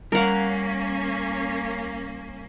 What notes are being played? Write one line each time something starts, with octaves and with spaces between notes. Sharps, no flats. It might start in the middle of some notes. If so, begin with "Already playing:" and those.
G3 A#3 C#4 A#4 F5 F#5